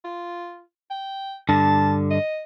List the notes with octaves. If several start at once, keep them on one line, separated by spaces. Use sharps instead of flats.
F4
G5
G2 D3 A5
D#5